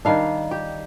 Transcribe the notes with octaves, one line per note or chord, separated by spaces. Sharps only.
D#3 G3 D4 F5
G4